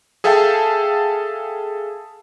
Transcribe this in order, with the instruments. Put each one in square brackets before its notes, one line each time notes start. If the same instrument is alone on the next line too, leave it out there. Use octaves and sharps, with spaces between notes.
[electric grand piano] G#4 A4 E5 F5 G5 A5